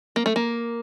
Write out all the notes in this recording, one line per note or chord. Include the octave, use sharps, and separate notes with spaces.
A#3
A3
A#3